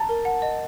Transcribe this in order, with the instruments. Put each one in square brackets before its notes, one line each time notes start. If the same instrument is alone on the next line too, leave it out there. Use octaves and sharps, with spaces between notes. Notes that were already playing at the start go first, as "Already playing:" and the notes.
Already playing: [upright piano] A5 [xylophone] A#5
[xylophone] A#4
F#5
D#5